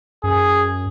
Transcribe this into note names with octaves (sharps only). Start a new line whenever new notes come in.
F#2 G#4